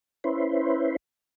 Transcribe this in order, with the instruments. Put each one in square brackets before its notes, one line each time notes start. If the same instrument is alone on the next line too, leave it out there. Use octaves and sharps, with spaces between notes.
[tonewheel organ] C#4 E4 B4 C5